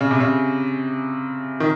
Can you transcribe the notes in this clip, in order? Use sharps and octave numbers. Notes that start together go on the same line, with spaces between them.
C#3
C3
C#3
D#3